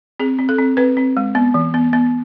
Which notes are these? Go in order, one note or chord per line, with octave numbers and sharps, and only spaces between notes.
C4 G#4
C4
A4
C4
C4 B4
C4
G#3
B3
E3
B3
B3